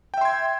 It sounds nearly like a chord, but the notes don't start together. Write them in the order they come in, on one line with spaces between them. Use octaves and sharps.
G5 E5 C6 G#6